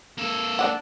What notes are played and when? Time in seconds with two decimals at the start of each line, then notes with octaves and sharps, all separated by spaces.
0.18 A#3 A4
0.59 D4 F#5